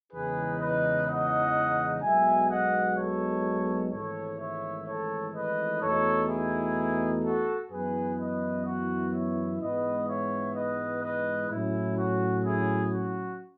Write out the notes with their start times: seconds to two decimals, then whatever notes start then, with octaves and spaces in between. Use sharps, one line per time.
0.13 E2 C#3 E3 G#3 D#4 G#4 B4
0.60 B4 D#5
1.08 D#5 F#5
2.02 B1 B2 G#3 E5 G#5
2.50 D#5 F#5
2.98 A4 C#5
3.92 G#1 G#2 E3 A3 A4 C#5
4.39 C#5 E5
4.87 A4 C#5
5.34 B4 D#5
5.82 E2 B2 A3 D#4 A4 C#5
6.29 E4 G#4
7.24 F#4 A4
7.71 F#2 E3 B3 E4 G#4 B4
8.19 B4 D#5
8.66 F#4
9.14 C#5 E5
9.61 G#2 E3 G#3 B3 B4 D#5
10.08 C#5 E5
10.56 B4 D#5
11.03 B4 D#5
11.51 A2 F#3 C#4 E4
11.97 F#4
12.45 E4 G#4
12.93 F#4